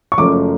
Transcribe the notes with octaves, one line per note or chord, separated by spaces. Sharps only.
C#6
F#1 F#2 F3 A3 D6